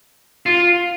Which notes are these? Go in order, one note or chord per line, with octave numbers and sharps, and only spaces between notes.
F4